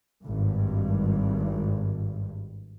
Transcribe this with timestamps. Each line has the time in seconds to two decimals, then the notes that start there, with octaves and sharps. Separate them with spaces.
0.23 G#1 G2